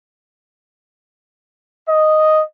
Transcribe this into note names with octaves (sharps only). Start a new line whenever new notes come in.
D#5